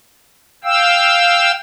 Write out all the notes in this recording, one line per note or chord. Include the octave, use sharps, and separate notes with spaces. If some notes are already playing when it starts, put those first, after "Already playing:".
F5 G5 E6